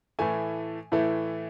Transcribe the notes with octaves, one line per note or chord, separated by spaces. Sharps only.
A2 E3 A3 G#5
A2 E3 A3